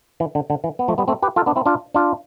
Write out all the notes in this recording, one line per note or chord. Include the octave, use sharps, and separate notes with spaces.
E3
D3
D3
E3
B3
F3 A3
G3 B3
A3 C4
G4 B4
F4 A4
B3 D4
C4 E4
D4 F4
D4 F4